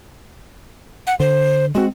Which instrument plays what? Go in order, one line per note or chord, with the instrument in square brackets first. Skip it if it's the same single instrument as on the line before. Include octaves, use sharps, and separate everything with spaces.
[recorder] F#5
[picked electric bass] D3 [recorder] C5
[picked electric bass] G#3 C4 [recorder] F#4